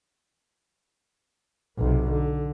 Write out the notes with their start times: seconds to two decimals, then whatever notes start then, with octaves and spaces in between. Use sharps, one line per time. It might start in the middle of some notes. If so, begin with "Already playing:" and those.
1.78 B1 C3
2.11 D3